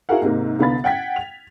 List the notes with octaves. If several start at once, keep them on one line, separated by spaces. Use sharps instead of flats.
E4 F#4 G#4 A#4 F5 F#5
G#2 C3 A#3
C2 D3 B3 F5 B5 A6
F#5 G5 G#6 B6
F7